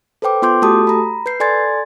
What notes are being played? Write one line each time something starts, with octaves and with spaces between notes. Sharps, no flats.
A4 B4 C5 G5 D6
B3 F4 C6 D6 G6
A3 F#4 G4 A4 A5 D#6
A#5 B5
B4 G6 C7
A4 D5 G#5 C6 G#6 A6